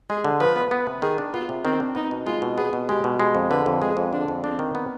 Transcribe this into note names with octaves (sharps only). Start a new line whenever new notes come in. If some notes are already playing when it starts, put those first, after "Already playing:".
G#3 G#4
D3
F3 B4
B3
B3
C3
D#3 G#4
D4
B3 F4
C3
D#3 C4
D4
B3 D#4
B2
G#3 F4
B2
B3 G#4
B2
G#3 G4
B2
G#3 G4
F2
D3 B4
F2
G#3 G#4
F2
D3 D4
F2
C4 D4
D#3
B3